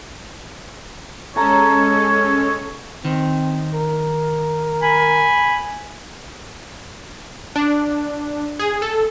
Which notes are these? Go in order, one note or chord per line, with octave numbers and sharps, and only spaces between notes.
G#3 C#4 A4 C#5 A5 A#5
D#3 C4
A#4
G#5 B5
D4
G#4
A4